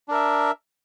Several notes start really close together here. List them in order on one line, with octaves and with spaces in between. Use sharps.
D4 A#4 E5